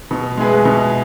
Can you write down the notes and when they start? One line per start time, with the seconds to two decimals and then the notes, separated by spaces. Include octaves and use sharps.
0.11 B2
0.37 G#3 E4 G#4 B4
0.65 B2